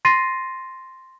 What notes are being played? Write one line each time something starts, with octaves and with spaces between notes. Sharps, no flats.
C6 A6 A#6 C7 D#7